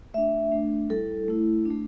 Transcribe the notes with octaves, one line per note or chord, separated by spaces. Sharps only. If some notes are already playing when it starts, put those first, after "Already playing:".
A3 D4 E5
A3 D4
G3 E4 A4
A3 E4
D4
A3